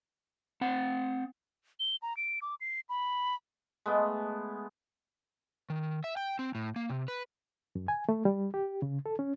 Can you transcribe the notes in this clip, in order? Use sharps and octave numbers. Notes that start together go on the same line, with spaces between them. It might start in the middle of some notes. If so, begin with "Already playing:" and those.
C4 F#5
G7
A#5
D7
D6
C7
B5
G#3 A3 B3
D#3
E5
G5
C4
A2
A#3
C3
B4
F#2
G#5
A3
G3
G4
C#3
A4
C#4